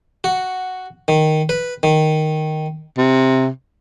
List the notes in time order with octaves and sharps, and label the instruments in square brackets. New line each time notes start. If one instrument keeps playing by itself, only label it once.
[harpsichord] F#4
D#3
B4
D#3
[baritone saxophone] C3